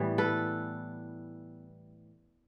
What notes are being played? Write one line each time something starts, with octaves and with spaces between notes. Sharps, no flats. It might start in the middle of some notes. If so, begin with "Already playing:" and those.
Already playing: A2 E3 G3 B3
A4 B4